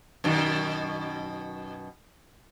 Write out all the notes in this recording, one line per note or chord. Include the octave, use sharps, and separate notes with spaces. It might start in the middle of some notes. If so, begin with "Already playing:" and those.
F#2 B2 D#3